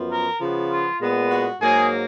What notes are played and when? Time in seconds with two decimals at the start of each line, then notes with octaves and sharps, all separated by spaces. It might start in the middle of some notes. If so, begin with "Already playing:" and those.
Already playing: F#2 F3 B3
0.09 A#4
0.39 C#3 F3 B3
0.68 F4
0.99 A#2 G#3 B3
1.29 F#4
1.59 G#2 F#3 A#3 G#4